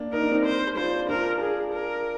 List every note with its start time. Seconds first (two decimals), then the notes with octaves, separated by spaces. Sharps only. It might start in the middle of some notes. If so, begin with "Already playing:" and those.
Already playing: A#3 D4
0.12 D#4 A#4
0.22 D4
0.32 C4 D#4
0.45 C5
0.77 D4 F4 C5
1.09 D4 F4 A#4
1.41 G#4
1.73 A#4